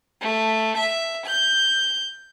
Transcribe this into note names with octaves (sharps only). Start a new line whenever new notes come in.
A3
E5
G6